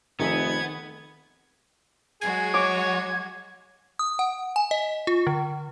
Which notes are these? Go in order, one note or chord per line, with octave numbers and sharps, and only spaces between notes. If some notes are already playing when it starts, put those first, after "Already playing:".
F1 D#3 B3 G#4 E5 G#6
F#3 G#3 F#4 G#4 G#6
C#5 D6
D#6
F#5
G#5
D#5
F4
D3